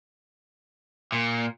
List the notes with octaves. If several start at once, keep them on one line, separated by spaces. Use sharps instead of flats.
A#2